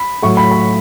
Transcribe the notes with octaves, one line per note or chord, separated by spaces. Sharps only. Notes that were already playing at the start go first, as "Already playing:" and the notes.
Already playing: B5
A2 F#3 C#6
B5
B5